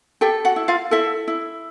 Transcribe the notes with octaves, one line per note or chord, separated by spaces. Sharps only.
G4 A4 G5
F#4 F#5
E4
F4 F5
E4 A4 E5
E4